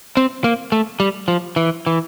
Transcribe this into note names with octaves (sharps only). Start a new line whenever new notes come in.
C4
A#3
A3
G3
F3
E3
E3